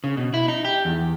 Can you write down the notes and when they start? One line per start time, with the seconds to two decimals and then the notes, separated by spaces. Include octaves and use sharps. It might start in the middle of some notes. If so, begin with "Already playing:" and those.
0.04 C#3
0.17 B2
0.34 E4
0.48 D#4
0.65 G4
0.85 E2